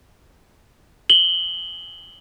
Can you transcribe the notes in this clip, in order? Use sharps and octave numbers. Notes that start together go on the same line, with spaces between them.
F#7 G7